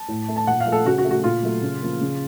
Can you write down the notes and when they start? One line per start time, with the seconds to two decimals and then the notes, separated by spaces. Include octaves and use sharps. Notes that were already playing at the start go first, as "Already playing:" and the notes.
Already playing: A5
0.08 A2
0.28 A3
0.36 A5
0.47 A#2 F#5
0.60 F5
0.66 F3 A3
0.72 A4
0.85 C#3 F#4
0.98 F#4
1.05 A3
1.11 F#4
1.24 A#2 F4
1.43 F#3 A3
1.62 C#3
1.81 F3 A#3
2.01 C#3